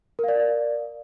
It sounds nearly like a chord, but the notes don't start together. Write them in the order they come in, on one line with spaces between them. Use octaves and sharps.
A#4 F5 D5